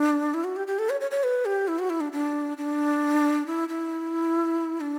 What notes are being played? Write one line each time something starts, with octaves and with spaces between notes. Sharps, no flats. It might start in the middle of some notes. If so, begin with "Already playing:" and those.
Already playing: D4
E4
F#4
G4
G4
A4
C#5
C#5
C#5
B4
G4
E4
F#4
E4
D4
D4
D4
E4
E4
D4